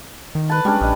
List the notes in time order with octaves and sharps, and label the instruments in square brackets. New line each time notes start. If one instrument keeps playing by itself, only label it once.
[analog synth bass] D#3
[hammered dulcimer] B4 A5
[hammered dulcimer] G3 C#4 D4 [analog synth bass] G#3
[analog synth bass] A#1 [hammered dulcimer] D#5